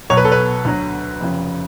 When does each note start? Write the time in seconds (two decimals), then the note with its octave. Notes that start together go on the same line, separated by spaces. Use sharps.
0.10 B1 B2 F#3 C#5
0.17 B4
0.25 A4
0.32 B4
0.65 D2 D3 F#3
1.20 F1 F2 C#3